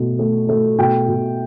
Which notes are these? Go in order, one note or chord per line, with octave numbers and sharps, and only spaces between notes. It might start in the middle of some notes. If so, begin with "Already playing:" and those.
Already playing: B2 A3
A3
A3
B2 G5
B2